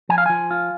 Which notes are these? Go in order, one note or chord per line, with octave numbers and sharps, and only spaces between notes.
F3 G#5
F5
F3 G#5
F4